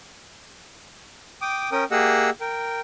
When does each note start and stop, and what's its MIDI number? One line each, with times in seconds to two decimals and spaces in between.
1.42 1.70 79
1.42 1.70 86
1.42 1.70 87
1.72 1.84 61
1.72 1.84 70
1.72 1.84 79
1.72 1.84 87
1.91 2.30 58
1.91 2.30 67
1.91 2.30 68
1.91 2.30 75
1.91 2.30 78
1.91 2.30 88
2.41 2.81 70
2.41 2.81 79